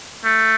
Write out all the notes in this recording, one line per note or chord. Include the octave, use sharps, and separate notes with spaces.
A3